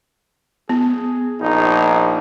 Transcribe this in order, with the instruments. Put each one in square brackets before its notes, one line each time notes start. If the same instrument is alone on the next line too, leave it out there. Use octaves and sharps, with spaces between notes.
[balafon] B3 [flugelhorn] G#4
[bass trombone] A#1 [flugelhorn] D#4